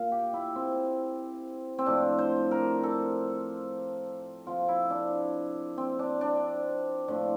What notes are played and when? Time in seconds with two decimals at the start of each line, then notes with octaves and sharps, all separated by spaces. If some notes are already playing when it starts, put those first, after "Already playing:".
Already playing: A#2 F5
0.12 G4
0.33 E4
0.56 C4
1.78 C4
1.86 A2 F3 D4
2.19 C5
2.51 A#4
2.83 A4
4.47 C3 F3 F4
4.68 E4
4.90 D4
5.78 C4
5.99 D4
6.21 D4
7.08 A2 F3 D4